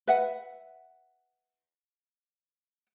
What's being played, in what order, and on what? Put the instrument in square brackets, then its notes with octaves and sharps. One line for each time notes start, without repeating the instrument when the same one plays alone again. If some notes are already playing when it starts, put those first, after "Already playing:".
[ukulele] B4 E5 F#5